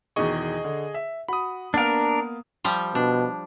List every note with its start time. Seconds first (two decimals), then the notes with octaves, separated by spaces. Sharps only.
0.16 E2 B2 D#3 G#4 D#5 C#6
0.64 D3
0.94 E5
1.28 F#4 B5 D#6
1.74 A#3 B3 D4 A#4 F5
2.64 F3 G3
2.95 B2 D4